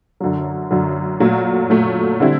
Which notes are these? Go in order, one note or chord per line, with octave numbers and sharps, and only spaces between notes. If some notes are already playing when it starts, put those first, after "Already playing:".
F#2 D3 F#3
F#2 D3 F#3
A#2 F#3 A3
A#2 F#3 A3
D3 G3 C4 E4